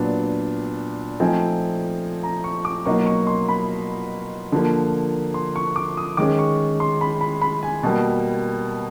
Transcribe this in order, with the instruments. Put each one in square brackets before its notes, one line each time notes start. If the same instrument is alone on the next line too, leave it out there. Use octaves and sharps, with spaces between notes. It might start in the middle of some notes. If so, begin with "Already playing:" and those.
Already playing: [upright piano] A#2 F#3 B3 D4
F3 A3 C4 D#4 G#5
A#5
C#6
D6
B2 F#3 A#3 D#4 C#6
C#6
C6
B5
D3 F3 A#3
C6
C#6
D6
D#6
D#3 G#3 C#4 D6
C#6
C6
B5
B5
B5
G#5
B2 G3 A#3 A5